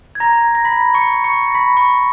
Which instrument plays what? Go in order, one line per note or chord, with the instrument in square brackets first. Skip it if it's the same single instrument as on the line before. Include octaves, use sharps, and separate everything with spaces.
[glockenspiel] G#6
A#5 A#6
A#6
B5 B6
C#6 C#7
C#6 C#7
A#6
B5 B6
C#6 C#7